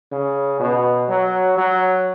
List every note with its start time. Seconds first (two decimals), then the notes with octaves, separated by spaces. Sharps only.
0.12 C#3
0.60 B2
1.09 F#3
1.58 F#3